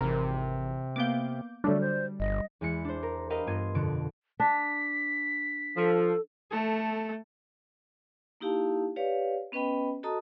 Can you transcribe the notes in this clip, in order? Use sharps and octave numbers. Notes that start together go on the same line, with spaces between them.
G#1 C3 E3 A#4
A#3 B3 F5 D6 G6
D3 F#3 G3 A3 D4
C5
G1 D#5
E2 G#3 E4 C#7
D4 C5
A#4
G4 A#4 B4 D#5 F5
G2 B3 F4 C6 G#6 D#7
F2 B2 D3 D7
D4 B6
F3 A4
A3 A4
A#3 D#4 E4 G4 F5 A5
G4 B4 C#5 D5 F5
B3 C#4 B4 D#5 G5 B5
F#4 A4 D#5 A5 A#5 D#6